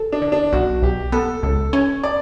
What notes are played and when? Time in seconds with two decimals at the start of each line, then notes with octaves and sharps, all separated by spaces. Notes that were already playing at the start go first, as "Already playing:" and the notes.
Already playing: A4
0.12 D4
0.22 D3
0.32 D4
0.53 B1 F#4
0.82 B1 G4
1.12 B3 A4
1.43 C#2 A4
1.73 C#4 C#5
2.04 D5